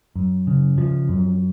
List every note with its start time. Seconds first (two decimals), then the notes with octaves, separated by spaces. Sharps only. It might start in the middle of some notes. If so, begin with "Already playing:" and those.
0.16 F#2
0.47 C#3
0.78 F3
1.09 F#2